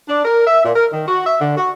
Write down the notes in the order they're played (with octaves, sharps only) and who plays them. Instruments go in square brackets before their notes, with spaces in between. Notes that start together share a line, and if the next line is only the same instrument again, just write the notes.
[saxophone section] D4
A#4
E5
A#2
A#4
D#3
F#4
E5
D3
F#4